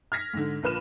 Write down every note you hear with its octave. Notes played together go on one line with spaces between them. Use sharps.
F6 G#6 A#6 B6
G#2 D3
A#1 A#2 B4 F6 E7